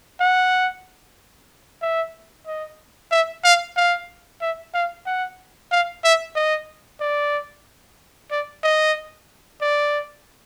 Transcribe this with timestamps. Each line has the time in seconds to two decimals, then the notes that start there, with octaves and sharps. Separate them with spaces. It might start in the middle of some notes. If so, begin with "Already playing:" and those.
0.20 F#5
1.82 E5
2.47 D#5
3.11 E5
3.44 F5
3.77 F5
4.41 E5
4.74 F5
5.06 F#5
5.71 F5
6.04 E5
6.36 D#5
7.01 D5
8.31 D5
8.63 D#5
9.61 D5